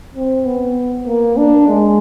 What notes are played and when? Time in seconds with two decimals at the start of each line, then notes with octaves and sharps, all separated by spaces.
0.15 C4
0.46 B3
1.06 A#3
1.37 D4
1.68 G#3